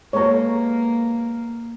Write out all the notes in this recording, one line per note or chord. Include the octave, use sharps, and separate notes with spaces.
G#3 A#3 B3 A4 C#5 A#5